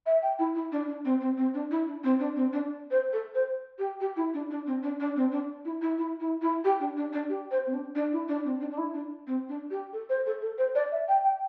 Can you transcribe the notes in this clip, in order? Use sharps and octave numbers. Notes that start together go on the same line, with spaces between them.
E5
G5
E4
E4
D4
D4
C4
C4
C4
D4
E4
D4
C4
D4
C4
D4
C5
A4
C5
G4
G4
E4
D4
D4
C4
D4
D4
C4
D4
E4
E4
E4
E4
E4
G4
D4
D4
D4
G4
C5
C4
D4
D4
E4
D4
C4
D4
D4
E4
D4
C4
D4
G4
A4
C5
A4
A4
C5
D5
E5
G5
G5